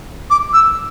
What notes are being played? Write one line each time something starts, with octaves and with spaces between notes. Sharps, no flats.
D6
E6